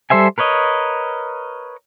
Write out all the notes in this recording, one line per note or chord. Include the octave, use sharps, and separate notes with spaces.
G3 A4 C5 E5 G#5
A#4 B4 C#5 D#5